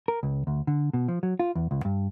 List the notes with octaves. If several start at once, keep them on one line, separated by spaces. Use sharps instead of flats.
A#4
C#2
D2
D3
B2
F3
F#3
F4
E2
C#2
G2